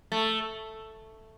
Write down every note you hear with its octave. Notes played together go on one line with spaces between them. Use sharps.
A3